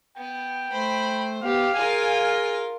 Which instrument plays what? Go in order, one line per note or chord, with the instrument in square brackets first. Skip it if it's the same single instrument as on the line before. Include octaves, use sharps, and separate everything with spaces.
[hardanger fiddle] B3 [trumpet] G5
[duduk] A3 [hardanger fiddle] C5 [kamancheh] B5
[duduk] B3 [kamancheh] G4 [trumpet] F5
[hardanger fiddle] F4 A#4 [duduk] G#4 [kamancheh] G#5